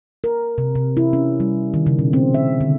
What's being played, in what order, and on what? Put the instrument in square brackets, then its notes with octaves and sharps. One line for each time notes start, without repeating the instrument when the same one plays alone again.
[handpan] A#4
C3
C3
E4
C#4
G3
D#3
C#3
B2
C4
E5
D3